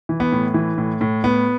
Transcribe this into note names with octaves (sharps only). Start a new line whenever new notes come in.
E3
B3
A2
E3
A2
A2
A2 B3